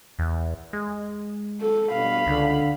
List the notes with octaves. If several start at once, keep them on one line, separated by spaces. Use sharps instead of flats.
E2
G#3
A4
G2 B2 F5 B5
C#2 D3